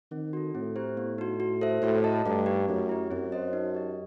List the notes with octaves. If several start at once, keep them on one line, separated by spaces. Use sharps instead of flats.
D#3 C4
F#4 A4
A2 C4
E4 G4 C5
B3
D#4 F#4
F#4
A4 C5 E5
A2 F#4
A4 D#5 A5
G2 A3
D#4 G4
F#2 A3
E4 G4
F#2 C4
F#4 C5 D#5
D#4
G4 D#5